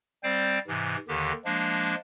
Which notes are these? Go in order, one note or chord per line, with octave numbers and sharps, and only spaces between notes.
G3 C4 C5 D5 F5 G5
G#2 C3 E3
D#2 D3 D#3 G4
F3 G#3 A#3 D4